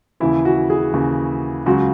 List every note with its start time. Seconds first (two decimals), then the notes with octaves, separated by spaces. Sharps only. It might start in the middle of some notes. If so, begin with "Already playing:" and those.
0.20 D#2 C#3 E3 E4
0.45 F#4
0.70 G#4
0.93 D#2 C#3 E3
1.66 C#2 C#3 F#3 F#4